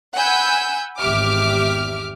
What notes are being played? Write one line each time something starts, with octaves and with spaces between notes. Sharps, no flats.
F#5 G#5 B5 E6 G6
G#1 E2 G4 E5 D6 F6